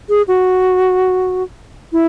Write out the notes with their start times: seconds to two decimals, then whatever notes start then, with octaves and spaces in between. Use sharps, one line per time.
0.09 G#4
0.28 F#4
1.93 E4